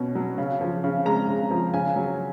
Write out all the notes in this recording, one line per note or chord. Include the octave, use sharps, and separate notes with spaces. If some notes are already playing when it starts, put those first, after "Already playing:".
Already playing: B2 C#4
F#3
C#3
F3
C#3
G#3 A#5
C#3
F3
C#3 G#5
F#3